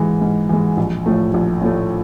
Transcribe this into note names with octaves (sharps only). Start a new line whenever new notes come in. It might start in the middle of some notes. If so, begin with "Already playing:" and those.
Already playing: G#2 E3 G#3
G#2
E3 G#3
A#1
A2 F3 A3
A#1
A2 F3 A3